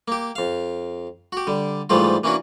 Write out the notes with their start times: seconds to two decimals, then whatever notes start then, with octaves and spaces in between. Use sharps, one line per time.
0.08 A#3 G4
0.36 F2 F5
1.32 F#4 G4
1.47 D3 G3
1.90 G#2 E3 F3 G3 A3 F4
2.24 E3 A#3 C#4 D4 F#4